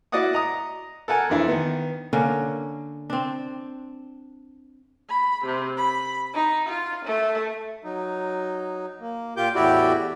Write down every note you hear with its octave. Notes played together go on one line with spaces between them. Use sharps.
E4 F#4 D5 D#5 F#5 D#6
D#5 A#5 D#6
A4 A#4 F#5 G#5
F2 E3 D4 E4
D#3 B3
D3 A#3 C#4
C4 D4
B5
C3
B5
D#4
F4
A3
F#3 D#4
A#3
A#2 F4 G4 D6 G6
E2 A2 E4 F#4 G4 D5